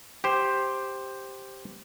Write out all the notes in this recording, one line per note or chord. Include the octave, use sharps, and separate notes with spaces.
G4 C5